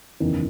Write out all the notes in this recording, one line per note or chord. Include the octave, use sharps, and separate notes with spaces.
F#1 E2 D#3